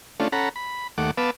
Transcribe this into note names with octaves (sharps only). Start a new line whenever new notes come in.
A3 C#4 D4 F4
C#4 A4 F#5 A#5 B5
B5
D#2 A3 F#5 D6
B3 B4 F5 A5 D6 E6